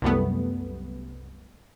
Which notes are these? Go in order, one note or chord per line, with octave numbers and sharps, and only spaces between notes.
C2 F#2 G3 A3 B3